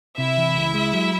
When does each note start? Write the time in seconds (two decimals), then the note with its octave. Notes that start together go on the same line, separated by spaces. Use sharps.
0.18 C3 E4 E5
0.37 E3
0.56 C#2
0.74 G#3
0.94 F#3